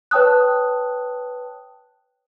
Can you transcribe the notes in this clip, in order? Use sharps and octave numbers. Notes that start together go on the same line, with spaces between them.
B4 C#5 G5 A5 D#6 F#6